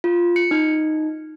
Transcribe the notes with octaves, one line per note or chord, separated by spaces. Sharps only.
F4
C#7
D#4